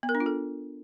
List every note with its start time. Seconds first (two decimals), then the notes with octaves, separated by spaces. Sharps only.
0.03 B3
0.09 A#4
0.15 D4
0.20 F4
0.26 A4